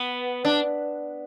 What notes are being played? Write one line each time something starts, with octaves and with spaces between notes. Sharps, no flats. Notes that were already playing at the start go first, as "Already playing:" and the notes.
Already playing: B3
D4